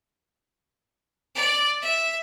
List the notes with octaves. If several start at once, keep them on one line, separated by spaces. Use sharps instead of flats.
D5
E5